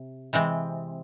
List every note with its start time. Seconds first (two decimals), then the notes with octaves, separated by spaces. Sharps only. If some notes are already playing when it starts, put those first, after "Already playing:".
Already playing: C3
0.33 C3 E3 G#3 C4